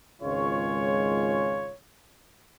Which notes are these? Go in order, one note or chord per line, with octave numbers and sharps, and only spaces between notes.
G#1 C#2 G#3 F4 C#5